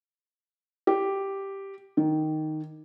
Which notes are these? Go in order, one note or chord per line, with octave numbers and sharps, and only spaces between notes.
G4
D#3